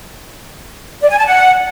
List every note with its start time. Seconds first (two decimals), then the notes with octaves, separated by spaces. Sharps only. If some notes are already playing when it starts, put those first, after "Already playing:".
1.02 D5
1.10 G#5
1.18 A5
1.26 F#5